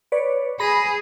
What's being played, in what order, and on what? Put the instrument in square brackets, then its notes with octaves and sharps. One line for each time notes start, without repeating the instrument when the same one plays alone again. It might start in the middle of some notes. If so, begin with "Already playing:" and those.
[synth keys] B4 C#5 D5
[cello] G#4 [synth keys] B5 A#6